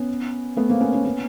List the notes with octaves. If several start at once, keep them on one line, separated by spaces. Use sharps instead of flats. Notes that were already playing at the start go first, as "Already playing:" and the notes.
Already playing: B3 C#4
A3 B3
A#3 C4
B3 C#4
B3 C#4
B3 C#4